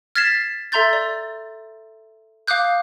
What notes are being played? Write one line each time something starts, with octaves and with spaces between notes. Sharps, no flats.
F6 G#6 A6 B6 C7 E7
A4 E5 A#5 C6 G6 A6
D5
F5 D6 D#6 F#6 G6